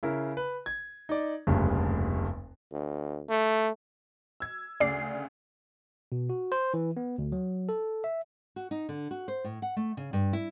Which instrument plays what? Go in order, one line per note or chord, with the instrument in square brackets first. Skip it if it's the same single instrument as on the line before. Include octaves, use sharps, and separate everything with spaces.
[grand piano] C#3 E4 A#4
B4
G#6
D#4 D5
F1 D2 G2 A#2 C#3
[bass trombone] D2
A3
[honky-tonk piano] E6 G#6
[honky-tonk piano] D2 C#3 [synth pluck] D5 C7
[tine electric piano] B2
F#4
C5
E3
B3
D2
F#3
A4
E5
[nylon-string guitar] F#4
D#4
D3
F#4
C5
A2
F#5
A3
C#3
G2
E4